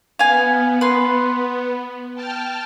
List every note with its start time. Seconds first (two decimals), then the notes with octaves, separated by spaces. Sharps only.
0.19 B3 F5 G#5
0.81 B4 C6
2.14 G5 A5 F6